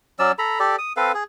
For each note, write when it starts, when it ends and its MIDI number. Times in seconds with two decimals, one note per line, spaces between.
0.19 0.32 54
0.19 0.32 61
0.19 0.32 74
0.19 0.32 88
0.39 0.59 69
0.39 0.59 82
0.39 0.59 83
0.60 0.76 67
0.60 0.76 69
0.60 0.76 74
0.78 0.93 87
0.97 1.12 60
0.97 1.12 69
0.97 1.12 71
0.97 1.12 77
1.14 1.24 68